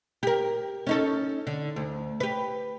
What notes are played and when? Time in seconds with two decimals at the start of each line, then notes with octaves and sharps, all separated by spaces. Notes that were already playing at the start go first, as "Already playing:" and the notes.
0.23 G4 A#4
0.87 C#4 D#4 A4
1.47 D3
1.76 D2
2.20 G4 B4